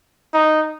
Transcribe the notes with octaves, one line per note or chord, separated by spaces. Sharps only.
D#4